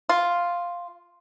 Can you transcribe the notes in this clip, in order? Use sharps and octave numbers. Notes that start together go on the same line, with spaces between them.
F4